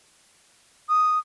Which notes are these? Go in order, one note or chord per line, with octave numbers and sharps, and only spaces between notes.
D#6